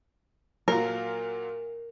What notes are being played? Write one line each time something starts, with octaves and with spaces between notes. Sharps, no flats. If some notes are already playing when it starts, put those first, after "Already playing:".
A#2 F#3 F4 A#4